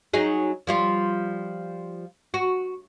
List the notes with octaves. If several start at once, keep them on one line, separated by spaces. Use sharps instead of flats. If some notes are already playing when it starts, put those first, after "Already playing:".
F#3 D#4 G#4
F3 G3 F4
F#4